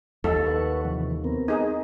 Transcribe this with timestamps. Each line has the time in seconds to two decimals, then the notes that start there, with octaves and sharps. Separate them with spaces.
0.24 D#2 F3 A4
0.46 B4 F#5 C#6
0.85 C3 E3 F3
1.24 B3 C4 A#4
1.48 D#4 G#4